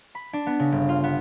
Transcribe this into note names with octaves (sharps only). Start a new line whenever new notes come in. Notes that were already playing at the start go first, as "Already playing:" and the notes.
B5
D4
B3
C#3
G1
F4
B3